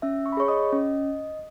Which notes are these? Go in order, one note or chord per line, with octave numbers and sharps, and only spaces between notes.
C#4 E5 E6
C#6
B5
G#4 C#5 C#6
D#5 D#6
C#4